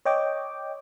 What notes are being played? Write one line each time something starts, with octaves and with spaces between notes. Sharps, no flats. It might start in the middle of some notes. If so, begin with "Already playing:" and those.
C#5 D#5 G5 D6